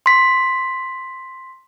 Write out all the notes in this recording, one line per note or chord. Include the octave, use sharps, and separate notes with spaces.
C6 B6